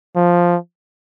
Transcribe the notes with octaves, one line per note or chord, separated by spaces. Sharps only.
F3